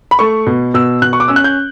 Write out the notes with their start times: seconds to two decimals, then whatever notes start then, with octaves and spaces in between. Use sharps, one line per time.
0.11 B5
0.19 A3 C#6
0.46 B2
0.74 B2 E6
1.02 B2 F#6
1.13 C#6
1.20 D6
1.28 C#4 E6
1.36 F#6
1.44 G6